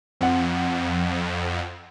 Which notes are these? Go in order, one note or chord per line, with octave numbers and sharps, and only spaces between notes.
F2 C4 F#5